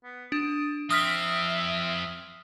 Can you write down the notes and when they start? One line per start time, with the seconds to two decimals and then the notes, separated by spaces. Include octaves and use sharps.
0.04 B3
0.32 D4 D#6
0.90 F2 C4 E5 D#6 F6 B6